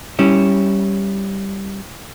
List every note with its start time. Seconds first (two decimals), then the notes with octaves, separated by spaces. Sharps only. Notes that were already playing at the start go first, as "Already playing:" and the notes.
0.19 G3 C#4 E4